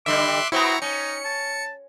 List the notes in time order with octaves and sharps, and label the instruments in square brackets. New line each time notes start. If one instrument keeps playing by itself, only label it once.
[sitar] D3 G3 [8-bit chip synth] E5 C6 F#6 [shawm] D6
[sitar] B3 C4 F#4 [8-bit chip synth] E4 A#5 [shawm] C#6
[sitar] C#4 [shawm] D#4 [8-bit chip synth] C#7
[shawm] A5